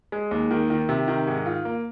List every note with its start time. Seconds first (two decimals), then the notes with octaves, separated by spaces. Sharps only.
0.12 G#3
0.31 D#2
0.51 D#3
0.70 D#3
0.89 C3
1.08 D#3
1.27 G#2
1.46 F4
1.65 A#3